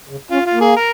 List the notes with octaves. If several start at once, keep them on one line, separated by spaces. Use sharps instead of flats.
C#3
C#4 F4
F4
A#3
G#4
A#4